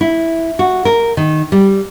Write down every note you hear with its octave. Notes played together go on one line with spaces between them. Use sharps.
E4
F#4
A#4
D#3
G3